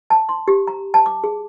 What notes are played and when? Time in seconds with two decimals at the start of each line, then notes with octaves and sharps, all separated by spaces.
0.10 A5
0.29 C6
0.48 G4
0.67 A#5
0.94 A5
1.06 D6
1.24 G#4